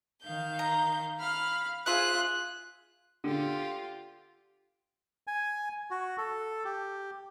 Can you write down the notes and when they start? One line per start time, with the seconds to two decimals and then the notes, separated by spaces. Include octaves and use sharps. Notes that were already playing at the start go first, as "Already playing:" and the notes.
0.22 D#3 F5 G6
0.59 A#5
1.18 F5 B5 F6
1.86 F4 G#4 C5 E5 F#6
3.24 D3 F4 G4
5.27 G#5
5.91 F#4
6.18 A4
6.65 G4